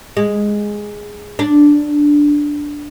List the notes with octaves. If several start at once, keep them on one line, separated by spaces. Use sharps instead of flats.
G#3
D4